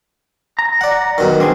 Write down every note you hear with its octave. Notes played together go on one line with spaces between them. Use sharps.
A#5
D5 F#5
F#2 B2 D#3
C4 D4 G#4